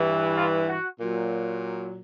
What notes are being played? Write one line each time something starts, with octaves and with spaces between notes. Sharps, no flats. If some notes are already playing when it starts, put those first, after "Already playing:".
Already playing: G2 E3
F4
F#4
A#2 F#3